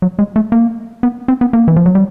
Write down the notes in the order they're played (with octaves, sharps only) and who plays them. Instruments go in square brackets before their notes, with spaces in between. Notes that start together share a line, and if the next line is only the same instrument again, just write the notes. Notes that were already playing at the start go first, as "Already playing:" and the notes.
[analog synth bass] F#3
G#3
A3
A#3
B3
C4
B3
A#3
E3
F3
F#3
G3